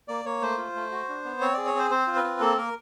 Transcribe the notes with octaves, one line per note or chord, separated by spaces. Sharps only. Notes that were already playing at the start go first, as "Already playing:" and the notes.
A#3 D5
A#3 C#5
A3 C5
F4
A3
F#4
D4
B3
C4 C#5
G#4 D5
C#5
C4 C5
C4 C5
F4
B4
C4
A#3 A4
A#3 A#4